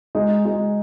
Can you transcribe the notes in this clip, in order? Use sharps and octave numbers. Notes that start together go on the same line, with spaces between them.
G#3 D#4
G#3